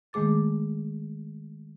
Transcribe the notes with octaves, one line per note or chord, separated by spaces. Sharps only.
D#3 G#3 A3 G#4 D6 A6